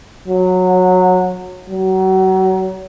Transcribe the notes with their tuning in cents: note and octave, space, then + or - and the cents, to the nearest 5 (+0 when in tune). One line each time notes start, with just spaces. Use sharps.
F#3 -15
F#3 +30